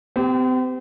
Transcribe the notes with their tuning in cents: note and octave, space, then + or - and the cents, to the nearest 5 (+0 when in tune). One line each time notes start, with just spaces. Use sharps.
C4 -40 G4 +0